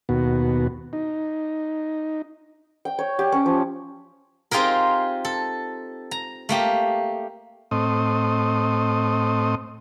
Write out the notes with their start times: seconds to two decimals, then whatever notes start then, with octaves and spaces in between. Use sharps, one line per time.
0.09 D#2 B2 B3 F#4
0.93 D#4
2.85 G5
2.99 C#5
3.19 G4
3.32 C#4
3.46 F3
4.51 C4 D#4 F4 G4 G#4 A#4
5.25 A4
6.11 A#5
6.49 A3 A#3 G4
7.71 A2 C4 D#5